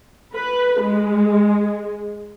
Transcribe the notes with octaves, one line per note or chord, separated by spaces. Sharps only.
B4
G#3